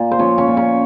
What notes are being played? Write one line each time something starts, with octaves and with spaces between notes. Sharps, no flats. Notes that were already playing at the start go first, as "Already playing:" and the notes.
Already playing: A#2
C5
F3 C#4 C#5
C#4 C#5
A#2
C#4 C#5